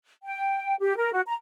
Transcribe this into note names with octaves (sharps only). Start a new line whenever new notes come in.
G5
G4
A#4
F#4
A#5